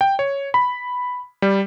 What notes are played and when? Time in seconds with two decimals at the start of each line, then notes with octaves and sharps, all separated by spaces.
0.01 G5
0.19 C#5
0.54 B5
1.42 G3